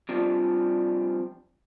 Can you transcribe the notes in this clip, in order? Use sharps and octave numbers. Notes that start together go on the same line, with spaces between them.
C3 F3 G3 D4